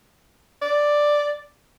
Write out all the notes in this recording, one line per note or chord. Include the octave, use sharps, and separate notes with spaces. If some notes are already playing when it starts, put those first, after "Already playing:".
D5